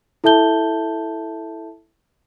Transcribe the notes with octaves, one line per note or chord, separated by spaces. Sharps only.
E4 A4 E5 A5 G6 G7